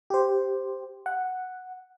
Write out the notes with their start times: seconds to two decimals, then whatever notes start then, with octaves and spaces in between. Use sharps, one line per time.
0.10 G4 C5
1.06 F#5